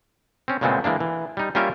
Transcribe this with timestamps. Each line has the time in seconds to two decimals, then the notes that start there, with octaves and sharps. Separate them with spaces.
0.48 C4 C#4
0.61 A#2 C#3 G#3 A3 B3 C4
0.84 E3 G#3 A#3 D4
1.00 E3
1.37 G3 D#4
1.55 G3 A#3 C#4 F4 A#4 E5